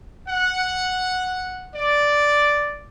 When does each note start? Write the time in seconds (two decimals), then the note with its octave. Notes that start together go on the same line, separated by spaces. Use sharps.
0.27 F#5
1.75 D5